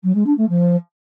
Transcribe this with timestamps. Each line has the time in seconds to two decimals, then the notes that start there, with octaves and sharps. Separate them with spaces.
0.03 F#3
0.15 G#3
0.26 D4
0.37 A3
0.49 F3